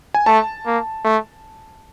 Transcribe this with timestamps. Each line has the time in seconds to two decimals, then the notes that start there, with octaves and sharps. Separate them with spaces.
0.14 G#5
0.26 A3 A5
0.66 A#3
1.05 A3